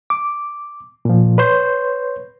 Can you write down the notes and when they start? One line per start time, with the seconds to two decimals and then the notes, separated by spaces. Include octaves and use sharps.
0.10 D6
1.05 A#2 F3
1.38 B4 C#5 C6 G6